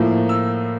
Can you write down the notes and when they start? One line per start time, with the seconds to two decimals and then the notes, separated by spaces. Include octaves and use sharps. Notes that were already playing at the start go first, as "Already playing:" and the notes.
Already playing: A2 F3 A#3
0.29 E6